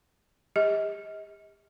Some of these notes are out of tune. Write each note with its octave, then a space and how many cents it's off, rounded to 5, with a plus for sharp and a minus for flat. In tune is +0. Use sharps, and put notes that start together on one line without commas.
G4 +40 D#5 +30